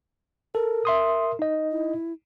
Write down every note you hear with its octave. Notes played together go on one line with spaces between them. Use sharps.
A4 A#4
E5 C6 D#6
D#4 D#5
E4